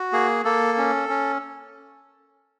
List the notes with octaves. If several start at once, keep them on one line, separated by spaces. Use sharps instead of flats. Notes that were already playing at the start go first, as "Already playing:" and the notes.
Already playing: F#4
A#3 G#4
A#3 A4
C#4
C#4